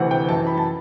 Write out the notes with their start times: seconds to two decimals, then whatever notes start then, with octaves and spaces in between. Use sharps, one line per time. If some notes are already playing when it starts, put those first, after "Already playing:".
Already playing: D2 C3 E3 F#5
0.11 G5
0.28 F#2 E3 A5
0.47 B5
0.57 A5